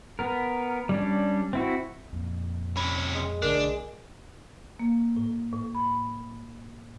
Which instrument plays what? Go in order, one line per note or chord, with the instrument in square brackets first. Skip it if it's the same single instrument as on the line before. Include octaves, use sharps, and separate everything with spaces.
[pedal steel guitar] B3 A#4
G3 C#4 D4
C4 E4 F#4
[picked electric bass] F2 A#2
[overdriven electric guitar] C3 C#4 [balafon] B5
[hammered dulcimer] G#3
[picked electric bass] B1 D3 A3 [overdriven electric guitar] D4 [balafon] A#4
[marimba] A#3
A2
A2
B5